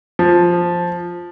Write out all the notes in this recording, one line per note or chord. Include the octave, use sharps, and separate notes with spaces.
F3